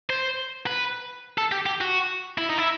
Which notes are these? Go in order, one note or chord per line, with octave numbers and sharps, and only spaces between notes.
C5
B4
A4
G4
G4
F#4
E4
D#4
E4